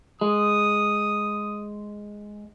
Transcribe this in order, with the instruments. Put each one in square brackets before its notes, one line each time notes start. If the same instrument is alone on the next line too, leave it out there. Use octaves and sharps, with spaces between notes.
[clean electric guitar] G#3 [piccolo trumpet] D#6